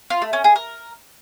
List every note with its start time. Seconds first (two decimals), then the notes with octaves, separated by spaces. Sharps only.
0.10 F4
0.22 A3
0.33 C#4
0.44 G#4
0.56 A#4